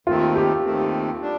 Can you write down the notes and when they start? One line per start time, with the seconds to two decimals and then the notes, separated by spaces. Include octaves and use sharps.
0.07 D#2 D#3 A3 C4 F4
0.35 G4
0.64 D#2 D#3 A3 C4
1.22 G3 D4